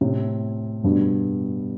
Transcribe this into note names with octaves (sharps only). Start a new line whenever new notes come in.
A2 C3
G2 B2